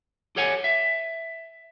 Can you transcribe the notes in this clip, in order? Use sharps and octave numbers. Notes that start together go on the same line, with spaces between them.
G4 A4 C#5 F#5 G#5
E5